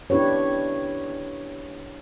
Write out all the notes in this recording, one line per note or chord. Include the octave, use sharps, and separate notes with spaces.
D4 E4 G4 B4 C#5